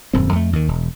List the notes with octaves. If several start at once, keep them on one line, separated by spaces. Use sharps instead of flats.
D#1 F#2 D#3 C4
F2 A3
D#2 D#3
E1